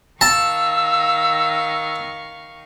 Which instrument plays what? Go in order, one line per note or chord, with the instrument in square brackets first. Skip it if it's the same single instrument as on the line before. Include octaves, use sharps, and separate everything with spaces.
[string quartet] D#3 F5 C#6 [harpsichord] A5 [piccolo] E6